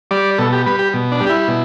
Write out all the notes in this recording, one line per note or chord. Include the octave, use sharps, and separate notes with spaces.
G3 D5
B2 A4
G4
G3 B4
G4
B2
D4
G3
G4
E4
B2